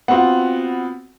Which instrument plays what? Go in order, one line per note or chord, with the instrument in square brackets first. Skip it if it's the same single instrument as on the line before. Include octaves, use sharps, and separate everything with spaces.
[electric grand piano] B3 C4 F4 [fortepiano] F#4 F#5